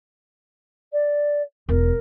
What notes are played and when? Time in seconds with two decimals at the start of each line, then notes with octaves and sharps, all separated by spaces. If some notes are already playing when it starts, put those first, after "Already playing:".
0.92 D5
1.69 E1 F4 A#4